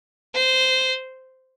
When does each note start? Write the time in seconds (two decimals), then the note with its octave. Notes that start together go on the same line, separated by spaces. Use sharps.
0.35 C5